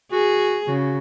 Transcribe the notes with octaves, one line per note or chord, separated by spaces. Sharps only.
F#4 G#4
C#3 F#4